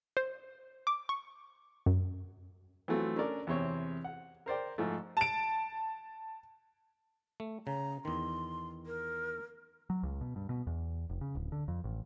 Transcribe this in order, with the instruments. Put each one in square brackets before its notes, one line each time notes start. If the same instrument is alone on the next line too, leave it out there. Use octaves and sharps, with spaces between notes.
[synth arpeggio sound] C5
D6
C#6
F#2
[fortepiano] E3 F#3 A3 C4 F4
C#4 D4 A4 A#4 D5
E2 C3 C4 C#5
F#5
A#4 C5 D5 G5
G#2 F3 A3
[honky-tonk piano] A5 D7
[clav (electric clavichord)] A3
[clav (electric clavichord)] C#3 [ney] A#5
[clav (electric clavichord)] E2 D#3 [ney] C6
[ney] A#4
[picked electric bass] F#3
C#2
B2
G2
B2
E2
F1
C#3
D1
D3
F2
A1